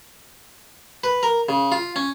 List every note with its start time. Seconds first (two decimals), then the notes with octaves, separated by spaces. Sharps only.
1.04 B4
1.23 A#4
1.49 C#3
1.72 F4
1.96 C#4